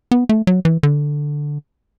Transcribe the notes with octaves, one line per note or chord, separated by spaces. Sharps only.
B3
A3
F#3
E3
D3